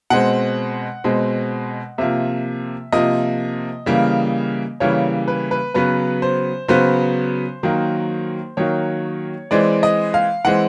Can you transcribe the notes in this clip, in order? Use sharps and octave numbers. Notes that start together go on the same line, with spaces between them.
B2 G#3 C4 F#5
B2 G#3 C4
C3 F3 A#3 E5
C3 F3 A#3 D#5
C#3 E3 G3 A#3
C#3 E3 G3 A#3 C#5
B4
B4
C#3 F#3 B3 B4
C5
C#3 F#3 B3 C5
D#3 F#3 A#3
D#3 F#3 A#3 C#5
E3 G#3 C4 D5
D#5
F5
E3 G#3 C4 F#5